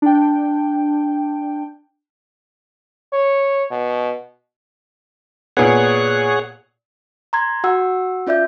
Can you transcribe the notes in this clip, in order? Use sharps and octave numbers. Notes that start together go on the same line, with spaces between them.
D4 G5
C#5
B2
A#2 B3 G#4 C#5 F#5
A#5 C6 G#6
F#4 F#5 E6
C#4 F4 D5 E5 G6